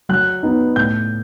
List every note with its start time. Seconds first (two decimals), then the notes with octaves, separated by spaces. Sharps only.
0.09 F#3 F#6
0.43 B3 D#4
0.76 A2 G6